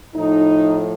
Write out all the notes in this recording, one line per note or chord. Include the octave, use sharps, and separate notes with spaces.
A2 F3 D#4